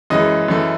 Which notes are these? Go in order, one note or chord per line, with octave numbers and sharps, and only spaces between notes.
F#2 E3 G#3 D#5
F#2 E3 A3